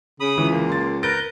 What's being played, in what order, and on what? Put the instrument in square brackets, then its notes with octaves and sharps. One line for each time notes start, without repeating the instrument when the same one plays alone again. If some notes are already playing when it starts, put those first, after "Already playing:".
[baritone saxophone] C#3 [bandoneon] B5 D#6
[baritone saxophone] C#2 [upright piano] E3
[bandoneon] A#3
[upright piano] C6 A6
[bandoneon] A#4 B4 G6 [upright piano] A6 A#6 D7